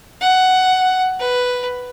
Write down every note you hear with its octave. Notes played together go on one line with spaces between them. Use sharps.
F#5
B4